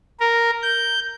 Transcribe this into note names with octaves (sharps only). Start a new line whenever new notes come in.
A#4
G6